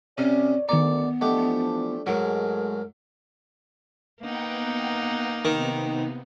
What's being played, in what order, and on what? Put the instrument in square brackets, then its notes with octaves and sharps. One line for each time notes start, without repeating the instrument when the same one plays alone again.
[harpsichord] C3 [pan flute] C#4 [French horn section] C#5 D5
[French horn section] D2 G#2 A#4 [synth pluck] D#3 G#5 A#5 [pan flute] B3 [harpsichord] D5
[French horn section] E3 F3 D4 [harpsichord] A3 G4 [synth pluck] D#5 F#5
[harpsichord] G#2 F#3 [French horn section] G#3 A3 [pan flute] A#4
[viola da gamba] A#3 D#4 [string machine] B3 F#5 G5
[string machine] C3 B3 [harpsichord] D#3